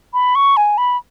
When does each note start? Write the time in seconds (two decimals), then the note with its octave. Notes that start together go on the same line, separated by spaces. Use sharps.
0.14 B5
0.35 C#6
0.57 G#5
0.78 B5